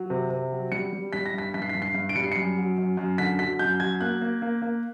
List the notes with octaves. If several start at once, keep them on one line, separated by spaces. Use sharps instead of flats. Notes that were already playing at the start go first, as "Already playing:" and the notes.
Already playing: F#3
C3
C3
F#3
G3 C#7
G3
G3 B6
A#6
G2 B6
G2 B6
C7
B6
G2
C7
G2
D7
G3 C#7
C7
F#2 C#7
F#3
F#2
F#2
D3 B6
F#3 B6
F#2 G6
F#3 G#6
A#3 F#6
A#3
A#3
A#3